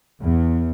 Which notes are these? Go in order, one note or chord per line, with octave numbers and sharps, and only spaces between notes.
E2